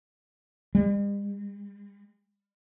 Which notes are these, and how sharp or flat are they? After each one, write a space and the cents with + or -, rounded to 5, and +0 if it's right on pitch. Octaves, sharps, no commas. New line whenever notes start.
G3 +45